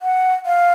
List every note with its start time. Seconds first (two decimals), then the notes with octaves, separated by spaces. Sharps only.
0.02 F#5
0.46 F5